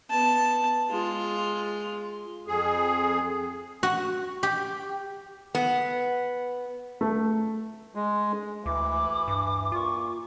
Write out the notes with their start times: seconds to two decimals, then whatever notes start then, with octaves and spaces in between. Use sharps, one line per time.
0.10 B3 A5
0.89 G#3 F4
2.47 F2 G#4
3.83 F#4
4.43 G4
5.55 B3
7.01 A3
7.95 G#3
8.66 D2 E3 D6
9.28 G2
9.72 A#2 F4 C#6 D6